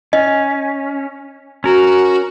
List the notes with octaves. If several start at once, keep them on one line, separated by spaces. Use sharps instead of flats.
C#4 D#5
C#4 F#4 A#4